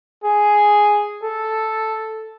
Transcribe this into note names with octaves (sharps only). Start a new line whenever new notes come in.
G#4
A4